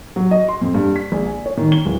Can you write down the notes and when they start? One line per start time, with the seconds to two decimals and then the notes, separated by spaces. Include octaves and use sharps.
0.16 F#3
0.31 D#5
0.48 C6
0.62 F2
0.74 G2
0.96 B6
1.12 A#1
1.26 G#5
1.46 C#5
1.57 D#3
1.72 G7
1.86 D1